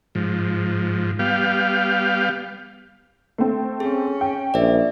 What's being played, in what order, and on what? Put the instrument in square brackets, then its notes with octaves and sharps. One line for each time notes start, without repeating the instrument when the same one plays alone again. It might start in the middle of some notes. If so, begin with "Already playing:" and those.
[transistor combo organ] G#2 F3
G3 B3 F5 G5
[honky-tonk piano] A3 C4
[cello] C#4 [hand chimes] G#4
[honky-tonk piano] G5
[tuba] A#1 [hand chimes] D5 E5